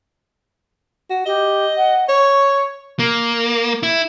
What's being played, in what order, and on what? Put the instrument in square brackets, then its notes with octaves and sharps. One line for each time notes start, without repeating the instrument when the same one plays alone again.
[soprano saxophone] F#4
[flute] G4 [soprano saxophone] D#5
[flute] F#5
[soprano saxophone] C#5 [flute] C#6
[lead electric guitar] A#3
E4